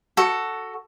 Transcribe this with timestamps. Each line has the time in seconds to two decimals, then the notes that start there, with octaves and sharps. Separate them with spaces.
0.17 F#4 A4